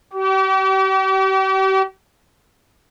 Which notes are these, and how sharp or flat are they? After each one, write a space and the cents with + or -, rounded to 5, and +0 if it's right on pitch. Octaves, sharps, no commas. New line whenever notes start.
G4 -40